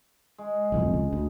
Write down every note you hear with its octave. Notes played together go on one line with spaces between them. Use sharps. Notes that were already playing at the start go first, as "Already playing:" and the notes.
G#3
D1 C2 F2
C#2
D2